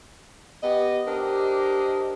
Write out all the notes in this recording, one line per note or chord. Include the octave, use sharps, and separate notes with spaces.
B3 G4 D#5
D4 G4 A#4 C5 D#5